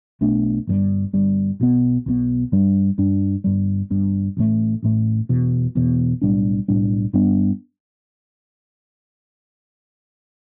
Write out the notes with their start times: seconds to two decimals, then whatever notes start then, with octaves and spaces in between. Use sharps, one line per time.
0.21 B1 B2 A3 D4
0.67 G1 G2 G3
1.13 G1 G2 G3
1.60 B1 B2 B3
2.06 B1 B2 B3
2.52 G2 G3 D4
2.98 G2 G3 D4
3.44 G1 G2 G3
3.90 G1 G2 G3
4.37 A1 A2 A3
4.83 A1 A2 A3
5.29 E1 E2 B2
5.75 E1 E2 B2
6.22 B1 A2 G3 D4
6.68 B1 A2 G3 D4
7.13 G2 G3 B3 D4